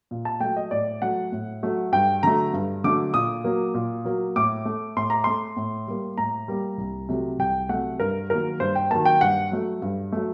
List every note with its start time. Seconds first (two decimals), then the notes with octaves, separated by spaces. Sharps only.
0.11 A#2
0.25 A5
0.40 F#3 A3 G5
0.57 D#5
0.71 A2 D5
1.02 F#3 A3 F#5
1.32 A2
1.63 F#3 A3
1.92 G2 G5
2.23 D3 F#3 A3 A#5
2.53 G2
2.84 D3 F#3 A3 D6
3.14 A#2 D#6
3.44 F#3 A#3
3.74 A#2
4.05 F#3 A#3
4.36 A2 D6
4.65 A3
4.96 A2 C6
5.10 A#5
5.24 A3 C6
5.56 A2
5.87 G3 A#3
6.17 A2 A#5
6.48 G3 A#3
6.78 C2
7.09 C3 F#3 A3
7.39 C2 G5
7.69 C3 F#3 A3 F#5
8.00 G2 A#4
8.30 D#3 F#3 A#3 A#4
8.60 G2 C5
8.75 G5
8.91 D#3 F#3 A#3 A5
9.05 G5
9.21 G2 F#5
9.52 F#3 A3
9.82 G2
10.12 F#3 A3